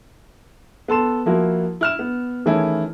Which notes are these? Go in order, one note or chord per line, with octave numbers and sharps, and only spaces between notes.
B3 A4 C6 E7
F3 A#3 E4 F#4
E4 F6 E7
B3
D#3 E3 A3 C#4 E4 G#4